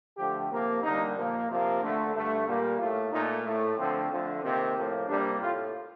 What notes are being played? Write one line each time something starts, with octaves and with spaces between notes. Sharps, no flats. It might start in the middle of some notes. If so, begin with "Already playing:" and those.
D3 F3 A3 G4
C3 F3 A#3
D3 G3 A#3 D#4
A#2 F3 A#3
C3 F3 A#3
D3 A3
G2 D3 A3
A#2 G3 A#3
A2 A3 F4
A#2 A3 D#4
A2 A3
D3 F3 A3 C4
D3 F3 A3
C3 D#3 A#3 C4
A2 F3 A#3
C3 G3 A#3 D4
A2 A3 F4